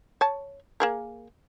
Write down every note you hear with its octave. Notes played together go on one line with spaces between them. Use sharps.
C#5 A5
A#3 G#4 A#4